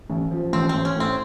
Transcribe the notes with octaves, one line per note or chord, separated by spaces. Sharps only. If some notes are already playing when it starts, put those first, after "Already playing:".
A1
F3
A1 C4
C4
A1
C#4
A2 C4